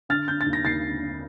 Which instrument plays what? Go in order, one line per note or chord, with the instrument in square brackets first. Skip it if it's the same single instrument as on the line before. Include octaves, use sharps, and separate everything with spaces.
[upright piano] D3 F6 A6
D3 G6
A6
D#2
A#6
D#2 A6 C7
D3
D3